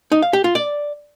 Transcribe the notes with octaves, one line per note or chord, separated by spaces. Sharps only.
D#4
F5
G4
F4
D5